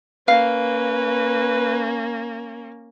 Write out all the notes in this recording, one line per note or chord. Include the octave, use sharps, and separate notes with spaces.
A#3 C#4 B4 F5